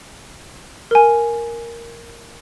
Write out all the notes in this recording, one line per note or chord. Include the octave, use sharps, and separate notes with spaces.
A#4 G#5